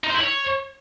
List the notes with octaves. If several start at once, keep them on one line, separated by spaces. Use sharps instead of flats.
D#4
C5
E4
C#5